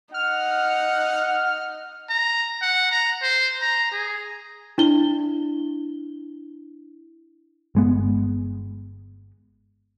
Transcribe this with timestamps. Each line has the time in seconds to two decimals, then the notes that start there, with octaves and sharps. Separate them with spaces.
0.14 D#4 F#5 F6
2.09 A#5
2.62 F#5
2.91 A#5
3.22 C5
3.61 A#5
3.92 G#4
4.78 D4 E4 G7
7.75 G1 G#3 B3